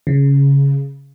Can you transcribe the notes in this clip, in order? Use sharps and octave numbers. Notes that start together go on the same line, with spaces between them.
C#3